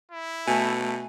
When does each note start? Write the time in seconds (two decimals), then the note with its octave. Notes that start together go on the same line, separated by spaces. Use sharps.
0.11 E4
0.48 B2 A3 G#5